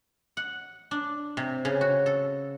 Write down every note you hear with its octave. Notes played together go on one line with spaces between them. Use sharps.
F#5
D4
C3
C#3
F#4
A4